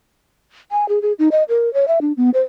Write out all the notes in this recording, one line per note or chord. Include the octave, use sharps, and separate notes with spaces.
G#5
G#4
G#4
D#4
D#5
A#4
C#5
E5
D4
B3
C5